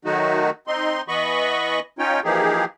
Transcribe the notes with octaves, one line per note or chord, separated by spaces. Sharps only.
D#3 F#3 A3 D#4 F#4
C4 D#4 C6
E3 B3 D#5 B5 C#6
C#4 D#4 F4 C#5 G5
E3 F3 A#3 D#4 G4 G#4